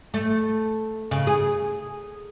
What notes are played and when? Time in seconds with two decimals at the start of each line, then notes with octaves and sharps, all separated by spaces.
0.14 A3
1.11 C#3
1.27 G#4